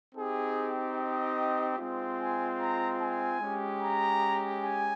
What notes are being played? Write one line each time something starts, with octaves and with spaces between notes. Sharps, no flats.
C4 D#4 G4 G#4
D#5
G#3 C4 F4
G#5
A#5
G#5
G#3 C#4 G4
A#5
G#5